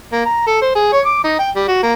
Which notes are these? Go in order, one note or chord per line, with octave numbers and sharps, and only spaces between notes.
A#3
A#5
A4
C5
G#4
C#5
D6
D#4
G5
G3
F#4
A#3